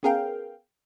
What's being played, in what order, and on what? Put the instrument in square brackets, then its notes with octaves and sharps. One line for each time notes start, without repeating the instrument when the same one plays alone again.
[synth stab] B3 C#4 G#4 A#4 F5 G5